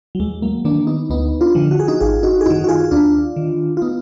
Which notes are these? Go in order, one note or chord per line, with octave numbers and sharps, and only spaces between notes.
F#3
D#2 G#3
F#3 A#3
D#3 A#3 D4
B3 D#4
D2 B3 D#4
D4 F4
D3 F3
F#4
G#4
D#4 F#4
G#1 F4 G#4
D#4 F#4
G#4
F#2 D#3 D#4 F#4
F#4
F4 G#4
D#2 D4 F4
D#3
F4
B3 D#4